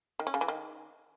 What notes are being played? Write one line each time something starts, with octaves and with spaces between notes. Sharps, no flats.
D#3
C#4
C#3
E3
D#3